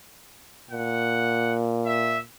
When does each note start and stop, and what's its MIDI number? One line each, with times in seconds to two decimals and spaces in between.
0.70 2.24 46
0.70 1.53 78
1.86 2.18 76